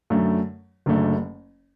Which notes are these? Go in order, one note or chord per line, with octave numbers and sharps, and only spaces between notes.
F#2 D3 A3
F#1 F#2 D3 A3